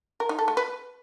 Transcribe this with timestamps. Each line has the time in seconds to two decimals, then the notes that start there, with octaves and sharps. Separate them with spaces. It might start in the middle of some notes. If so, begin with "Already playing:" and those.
0.20 A#4
0.29 D#4
0.39 A4
0.48 A3
0.57 B4